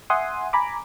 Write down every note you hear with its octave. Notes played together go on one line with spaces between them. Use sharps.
E5 F#5 G#5 C6 D#6
G#5 A#5 B5 D6